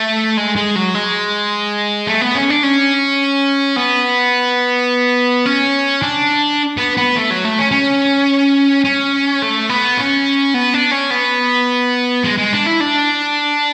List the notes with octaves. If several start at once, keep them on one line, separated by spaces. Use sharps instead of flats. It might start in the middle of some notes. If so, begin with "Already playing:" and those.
Already playing: A3
G#3
G#3
F#3
G#3
A3
B3
C#4
D4
C#4
B3
C#4
D4
B3
B3
A3
F#3
A3
C#4
C#4
C#4
A3
B3
C#4
B3
D4
C#4
B3
G#3
G#3
D4
E4
D4